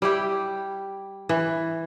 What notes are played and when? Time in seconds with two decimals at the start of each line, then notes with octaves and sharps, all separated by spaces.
0.02 G3 E4 G4
1.29 E3